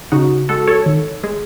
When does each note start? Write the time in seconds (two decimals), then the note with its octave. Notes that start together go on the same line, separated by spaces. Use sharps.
0.12 C#3 D#4 F#4
0.49 G#3 F#4 A4
0.67 A4 C#5
0.86 D#3
1.24 G#3